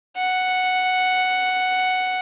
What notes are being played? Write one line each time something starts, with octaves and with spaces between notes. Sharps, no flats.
F#5